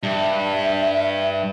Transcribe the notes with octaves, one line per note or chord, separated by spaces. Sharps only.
G2 E5